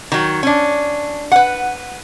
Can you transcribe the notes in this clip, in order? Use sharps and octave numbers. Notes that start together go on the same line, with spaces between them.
D#3 F#3
C#4 D4
B4 F#5